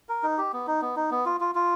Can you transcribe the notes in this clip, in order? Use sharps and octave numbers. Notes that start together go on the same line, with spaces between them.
A#4
D#4
G4
B3
D#4
B3
D#4
B3
F4
F4
F4